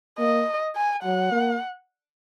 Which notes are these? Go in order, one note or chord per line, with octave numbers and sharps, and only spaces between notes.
A#3 D#5
G#5
F#3 F#5
A#3